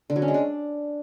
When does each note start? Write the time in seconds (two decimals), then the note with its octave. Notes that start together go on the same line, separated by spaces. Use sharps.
0.10 D3
0.16 F#3
0.22 C#4
0.28 G#3
0.34 D4